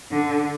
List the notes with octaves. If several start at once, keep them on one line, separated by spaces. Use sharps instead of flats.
D3